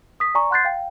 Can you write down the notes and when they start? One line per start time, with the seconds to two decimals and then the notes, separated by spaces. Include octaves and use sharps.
0.20 D#6 B6
0.35 D5 G#5 A#5 C#6
0.51 F#5 C6 F#6 G6 A6 C7
0.65 F5 G5